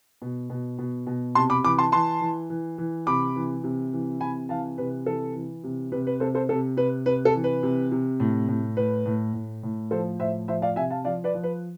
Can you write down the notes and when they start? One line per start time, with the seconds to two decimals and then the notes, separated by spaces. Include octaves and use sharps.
0.22 B2
0.50 B2
0.79 B2
1.07 B2
1.35 C3 A5 C6
1.50 B5 D6
1.64 E3 B5 D6
1.78 A5 C6
1.92 E3 A5 C6
2.21 E3
2.50 E3
2.78 E3
3.07 C3 B5 D6
3.36 E3
3.64 C3
3.93 E3
4.20 C3 G#5 B5
4.49 E3 F5 A5
4.78 C3 B4
5.06 E3 A4
5.35 E3
5.64 C3
5.92 C3 B4
6.07 B4
6.20 C3 A4 C5
6.35 A4 C5
6.49 C3 A4
6.77 C3 B4
7.06 C3 B4
7.25 A4
7.35 E3
7.44 B4
7.63 C3
7.92 C3
8.20 A2
8.48 A2
8.77 A2 B4
9.06 A2
9.34 A2
9.63 A2
9.91 F3 A4 C5
10.19 A2 C5 E5
10.48 F3 C5 E5
10.62 D5 F5
10.76 C3 E5 G#5
10.90 F5 A5
11.05 F3 D5 F5
11.24 B4 D5
11.34 F3
11.44 B4